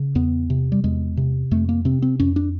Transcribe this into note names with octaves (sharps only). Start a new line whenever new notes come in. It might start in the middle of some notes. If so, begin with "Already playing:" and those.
Already playing: C#3
E2 B3
C3
G3
E2 G#3
C3
F2 A3
A#3
C3 C4
C4
F2 C#4
D4